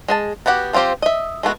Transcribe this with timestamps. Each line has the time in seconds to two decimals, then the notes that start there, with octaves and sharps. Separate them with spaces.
0.08 G#3 G#4 A5
0.46 B3 F#4 G4 F#5
0.73 F3 C4 F4 G4 C5
1.02 D#5 E5
1.43 G#3 A3 B3 F#4